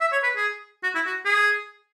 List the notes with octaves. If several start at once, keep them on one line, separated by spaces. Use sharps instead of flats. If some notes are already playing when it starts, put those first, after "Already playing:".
E5
C#5
B4
G#4
F#4
E4
F#4
G#4